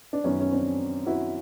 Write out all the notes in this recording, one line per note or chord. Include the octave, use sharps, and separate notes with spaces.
D4
F#2 D#3 B3 C#4
C#4
C4 D4
E4 F#4